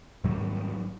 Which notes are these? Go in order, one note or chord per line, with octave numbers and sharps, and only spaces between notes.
G#2 D#3 F#3 G3